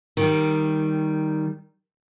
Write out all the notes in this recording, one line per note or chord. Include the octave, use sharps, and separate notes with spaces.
D#3 G3